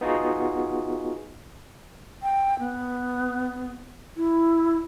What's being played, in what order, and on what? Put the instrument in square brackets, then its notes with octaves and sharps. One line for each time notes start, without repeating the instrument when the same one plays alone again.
[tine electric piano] B3 D#4 F4 F#4 G#4
[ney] G5
B3
E4